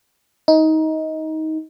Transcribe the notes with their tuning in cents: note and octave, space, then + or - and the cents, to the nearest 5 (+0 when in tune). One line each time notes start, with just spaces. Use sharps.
D#4 +20